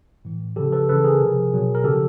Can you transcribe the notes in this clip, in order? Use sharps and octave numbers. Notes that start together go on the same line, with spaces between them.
A2 E3
C#3 F3 G4 A4
A4 B4
C#3 E3 A4 B4
G#4 A#4
C3 F3
B2 F#3
A#4
C#3 F3 G4 A4